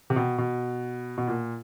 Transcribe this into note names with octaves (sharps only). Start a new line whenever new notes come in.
C3
B2
B2
B2
A#2